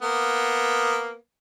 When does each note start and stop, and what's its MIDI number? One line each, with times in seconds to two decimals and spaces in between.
0.03 1.14 58
0.03 1.14 59